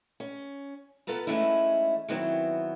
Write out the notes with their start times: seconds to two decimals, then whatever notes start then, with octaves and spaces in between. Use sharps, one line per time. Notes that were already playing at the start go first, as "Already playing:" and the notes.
0.20 C#4
1.07 B3 F4 A4 B4 A#5
1.27 E3 G#3 A3 C#4 D#4 E4
2.08 D#3 E3 F#3 B3 C4 E4